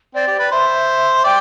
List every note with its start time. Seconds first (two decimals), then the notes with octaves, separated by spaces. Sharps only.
0.15 C4 D5
0.27 G4
0.39 B4
0.51 C5 E5
1.24 D5 G5